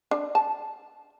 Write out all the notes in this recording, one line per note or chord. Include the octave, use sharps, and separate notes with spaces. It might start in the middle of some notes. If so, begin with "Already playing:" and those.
D4
A5